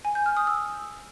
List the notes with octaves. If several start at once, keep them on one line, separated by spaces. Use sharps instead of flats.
G#5
G6
F6
D#6
E6